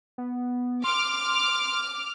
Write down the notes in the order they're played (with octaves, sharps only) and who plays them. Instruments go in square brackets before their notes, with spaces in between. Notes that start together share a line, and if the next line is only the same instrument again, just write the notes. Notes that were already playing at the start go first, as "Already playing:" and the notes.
[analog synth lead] B3
[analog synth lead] C6 [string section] D6 F6